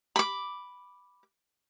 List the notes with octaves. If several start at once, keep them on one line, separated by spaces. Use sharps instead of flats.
B5 D6